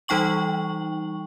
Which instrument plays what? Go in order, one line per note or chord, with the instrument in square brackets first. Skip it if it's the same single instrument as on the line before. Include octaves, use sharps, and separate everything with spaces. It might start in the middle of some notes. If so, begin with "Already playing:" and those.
[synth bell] E3 G3 D#4 G5 C#6 F#7